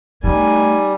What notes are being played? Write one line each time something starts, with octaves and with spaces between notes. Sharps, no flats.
G3 A3 D#4 G#5